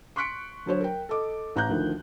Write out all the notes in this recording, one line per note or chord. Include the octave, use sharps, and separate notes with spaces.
C6 C#6 F#6 B6 C#7 D7
D3 F#3 C5 C#5
A#4 G5
A4 D#5 D6
A1 A#5 F#6 G6
D2 D3 D#3 F3